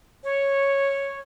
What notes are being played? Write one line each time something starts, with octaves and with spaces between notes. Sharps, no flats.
C#5